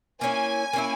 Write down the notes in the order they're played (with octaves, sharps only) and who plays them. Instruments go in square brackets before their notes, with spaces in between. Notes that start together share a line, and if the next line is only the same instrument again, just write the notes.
[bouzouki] A#3 C#4 E4 [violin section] G#5
[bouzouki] A#3 C#4 E4